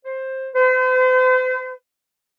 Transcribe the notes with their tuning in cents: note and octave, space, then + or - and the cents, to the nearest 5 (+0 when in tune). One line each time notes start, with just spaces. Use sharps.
C5 +15
C5 -40